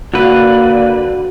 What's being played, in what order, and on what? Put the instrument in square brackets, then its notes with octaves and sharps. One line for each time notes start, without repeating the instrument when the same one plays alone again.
[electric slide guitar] D3 B4 [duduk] A#3 [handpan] F#4 [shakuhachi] D5